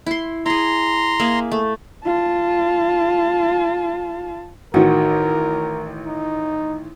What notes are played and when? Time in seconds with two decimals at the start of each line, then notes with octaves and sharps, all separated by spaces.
0.06 E4 C6
0.46 E4 G#4 A#5 C6
1.20 A#3 G#4 E5
1.52 A3
2.05 F4 A5
4.74 A1 D#3 F#4 A#4
6.06 D#4